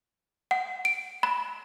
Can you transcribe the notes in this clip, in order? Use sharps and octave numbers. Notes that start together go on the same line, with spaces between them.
F#5
D7
B5